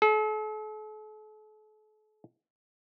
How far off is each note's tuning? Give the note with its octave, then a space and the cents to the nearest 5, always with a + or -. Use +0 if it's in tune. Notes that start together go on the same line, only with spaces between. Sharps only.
A4 -40